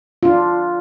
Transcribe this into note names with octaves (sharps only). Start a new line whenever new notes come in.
D4 F4